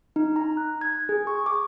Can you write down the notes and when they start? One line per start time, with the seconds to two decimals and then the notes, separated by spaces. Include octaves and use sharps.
0.16 D#4
0.36 A#5
0.57 F#6
0.81 G#6
1.09 G#4
1.27 C#6
1.46 D6